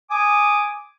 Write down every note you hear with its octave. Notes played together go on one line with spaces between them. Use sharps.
G#5 D6 D#6